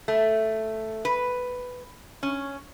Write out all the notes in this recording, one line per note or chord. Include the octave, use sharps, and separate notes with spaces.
A3
B4
C#4